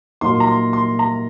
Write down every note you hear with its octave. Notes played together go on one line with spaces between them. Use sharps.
A#2 F#3 A#3 D#4 C6
A#5
C6
C6
A#5